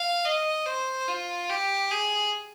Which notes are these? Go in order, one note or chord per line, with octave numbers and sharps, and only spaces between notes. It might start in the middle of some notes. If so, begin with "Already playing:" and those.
Already playing: F5
D#5
C5
F4
G4
G#4